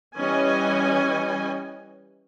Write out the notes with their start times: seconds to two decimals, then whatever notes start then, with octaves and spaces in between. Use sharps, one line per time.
0.17 E3 G3 C#4 D#5 G#5